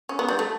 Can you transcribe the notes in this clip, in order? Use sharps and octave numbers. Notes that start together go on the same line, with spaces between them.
C#4
B3
G3
A3